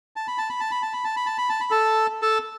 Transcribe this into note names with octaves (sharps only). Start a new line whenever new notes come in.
A5
B5
A5
B5
A5
B5
A5
B5
A5
B5
A5
B5
A5
B5
A4 A5
A4 A5